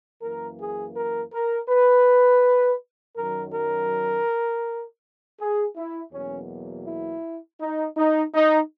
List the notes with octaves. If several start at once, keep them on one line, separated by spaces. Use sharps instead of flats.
F#2 E3 A#3 A#4
G#4
A#4
A#4
B4
F#2 D#3 F#3 A#4
A#4
G#4
E4
E2 B2 F#3 A#3 C#4
E4
D#4
D#4
D#4